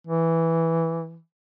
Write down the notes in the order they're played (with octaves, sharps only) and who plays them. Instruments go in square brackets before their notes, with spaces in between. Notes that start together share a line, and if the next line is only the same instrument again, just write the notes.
[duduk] E3